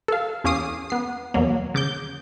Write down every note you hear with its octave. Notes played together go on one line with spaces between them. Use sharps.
A4 F5
E2 C#4 F5 D6 D#6 C7
B3 C7
E2 B2 F#3 A#3
C#3 D6 G6